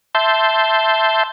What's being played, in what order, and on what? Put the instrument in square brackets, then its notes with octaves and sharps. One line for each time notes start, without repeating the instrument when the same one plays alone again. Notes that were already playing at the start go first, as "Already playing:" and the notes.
[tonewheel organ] E5 A5 C6 G6